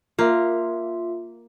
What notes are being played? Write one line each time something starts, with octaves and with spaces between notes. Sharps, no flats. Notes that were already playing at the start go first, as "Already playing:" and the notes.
A#3 F4 E5